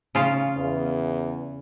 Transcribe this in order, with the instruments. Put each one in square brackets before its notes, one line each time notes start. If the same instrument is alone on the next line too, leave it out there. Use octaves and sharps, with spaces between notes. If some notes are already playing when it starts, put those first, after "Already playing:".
[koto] C#3 F4
[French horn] E2